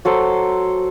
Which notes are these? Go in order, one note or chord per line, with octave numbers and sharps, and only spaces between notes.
F#3 A4 C5